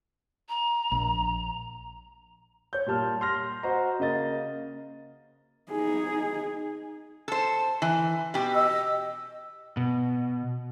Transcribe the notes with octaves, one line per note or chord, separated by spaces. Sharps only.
A#5
A#1
C#5 G6
A#2 G3 A5 F6
C6 F6 A#6
F#4 C5 D#5 A#5
C#3 A#3 D#5 A6
D#4 G#4
A4 C5
E3
B2 G4
D#5 E6
B2